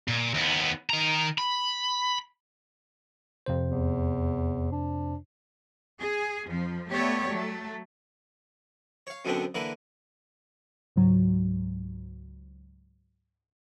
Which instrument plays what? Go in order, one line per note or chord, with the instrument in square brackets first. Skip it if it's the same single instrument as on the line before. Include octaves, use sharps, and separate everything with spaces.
[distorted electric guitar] A#2
D#2 B3
D#3 A#5
B5
[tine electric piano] F2 C3 C5
[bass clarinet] E2
D4
[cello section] G#4
F2 F3
A3 B3 G4 C#5 D5
F#3 A3
[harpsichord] C#5 F5
F#2 B2 D3 B3 C4 D4
D3 E3 A#3 B4
[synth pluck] C#2 G#2 F#3